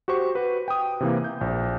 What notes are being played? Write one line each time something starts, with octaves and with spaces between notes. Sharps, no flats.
F#4 G4 C5 C#6
F#4 B4
G5 D#6
C3 E3 A#3
G6
A#1